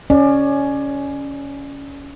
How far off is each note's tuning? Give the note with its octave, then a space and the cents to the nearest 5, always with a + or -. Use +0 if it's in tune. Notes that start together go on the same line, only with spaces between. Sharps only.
C#4 +10 D5 +30